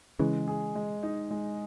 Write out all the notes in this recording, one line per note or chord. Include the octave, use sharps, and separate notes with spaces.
C#3 E3 G#3
G#4
G#3
D#4
G#3